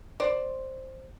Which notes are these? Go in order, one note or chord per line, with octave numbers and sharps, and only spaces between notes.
C5 D5